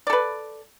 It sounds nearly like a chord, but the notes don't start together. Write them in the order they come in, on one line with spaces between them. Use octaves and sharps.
D5 A4 B4